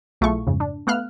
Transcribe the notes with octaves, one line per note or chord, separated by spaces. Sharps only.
B1 A3 E4 F4 G#4 C#6
F2 G#2 C#3
D4
A3 B3 F5 F6 F#6